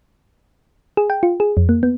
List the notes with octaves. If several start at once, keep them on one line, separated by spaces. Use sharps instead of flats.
G#4
G5
F4
G#4
F2
A#3
B3